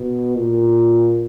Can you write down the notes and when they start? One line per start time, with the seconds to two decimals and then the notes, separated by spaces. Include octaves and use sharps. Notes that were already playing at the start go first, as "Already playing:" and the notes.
Already playing: B2
0.37 A#2